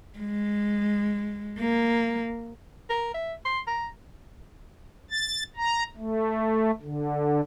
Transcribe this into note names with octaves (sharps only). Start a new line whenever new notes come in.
G#3
A#3
A#4
E5
C6
A#5
A6
A#5
A3
D3